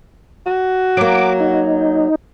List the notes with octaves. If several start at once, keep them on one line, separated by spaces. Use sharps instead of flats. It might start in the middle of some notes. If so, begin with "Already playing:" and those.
F#4
F#3 A#3 D6
D#4